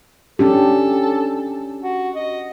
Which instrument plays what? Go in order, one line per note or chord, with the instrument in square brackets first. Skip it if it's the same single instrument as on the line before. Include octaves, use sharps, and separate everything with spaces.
[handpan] C#4 D4 G4 [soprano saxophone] A4
[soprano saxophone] F#4
D#5